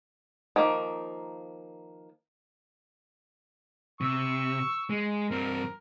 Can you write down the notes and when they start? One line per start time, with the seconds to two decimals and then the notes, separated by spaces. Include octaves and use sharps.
0.56 D#3 F3 A#3
4.01 C3 C#6 E6
4.90 G#3
5.31 G2 C4 A#4